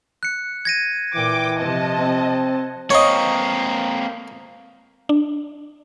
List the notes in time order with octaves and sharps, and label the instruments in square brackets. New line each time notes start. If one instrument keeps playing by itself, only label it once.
[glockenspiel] F#6 C#7
G#6 A#6 D#7
[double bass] A#2 [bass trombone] E3 [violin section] G5 D6
[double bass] C3 F3 [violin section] D#5 A5
[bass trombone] C4
[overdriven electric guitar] A#3 C4 [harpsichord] C#5 D#5
[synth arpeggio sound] D4